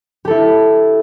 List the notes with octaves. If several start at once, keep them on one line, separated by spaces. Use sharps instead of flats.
E4 G4 A4